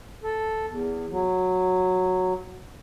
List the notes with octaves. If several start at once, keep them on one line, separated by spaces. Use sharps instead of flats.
A4
E2
F#3